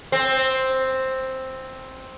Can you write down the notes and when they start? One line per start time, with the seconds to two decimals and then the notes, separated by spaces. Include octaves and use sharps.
0.12 C4